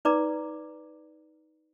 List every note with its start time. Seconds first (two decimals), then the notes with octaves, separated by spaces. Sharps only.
0.05 D#4 B4 D5 A#5 D6